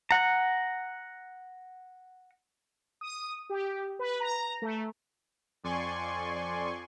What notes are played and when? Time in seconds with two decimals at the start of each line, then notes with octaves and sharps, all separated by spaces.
0.11 F#5 A#5
3.01 D#6
3.50 G4
3.99 B4
4.20 A#5
4.62 A3
5.64 F2 D5 G#5 C6 C#6